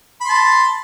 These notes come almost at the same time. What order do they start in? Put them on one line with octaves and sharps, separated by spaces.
B5 C6 A5